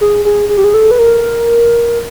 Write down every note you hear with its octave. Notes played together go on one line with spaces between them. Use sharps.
G#4
G#4
G#4
G4
G#4
A4
B4
A#4